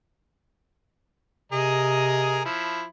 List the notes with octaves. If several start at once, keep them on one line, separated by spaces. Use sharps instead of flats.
C3 G#4 A#4 D#5
F3 E4